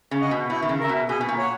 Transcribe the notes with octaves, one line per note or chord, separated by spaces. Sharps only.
C#3
D#5 F#5
B2
B2 E4
D#3
C#3
A#4 E5
B2
B2 G#4
B2
A#2
C#5 F#5